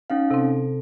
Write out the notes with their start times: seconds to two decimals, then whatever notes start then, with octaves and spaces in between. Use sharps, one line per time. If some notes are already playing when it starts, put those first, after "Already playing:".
0.10 C#4 D#4 F5
0.31 C3 C4 A4